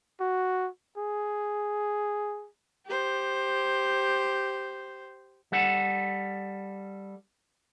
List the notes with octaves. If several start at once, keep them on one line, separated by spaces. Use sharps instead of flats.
F#4
G#4
G4 C5
G3 A4 F#5